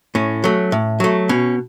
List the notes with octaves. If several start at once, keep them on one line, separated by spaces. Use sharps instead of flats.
A2 C#4
F#3 A3
A2
F#3 A3
B2 C#4